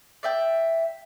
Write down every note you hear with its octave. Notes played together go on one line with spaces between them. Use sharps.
D5 E5 G5